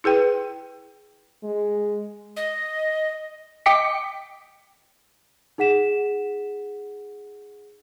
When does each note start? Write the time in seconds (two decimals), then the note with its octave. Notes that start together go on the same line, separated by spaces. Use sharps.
0.04 E4 G#4 B4 G5
1.43 G#3
2.36 D#5
3.66 D#5 G5 D6 B6 C#7
5.58 D#4 G#4 F#5 B6 E7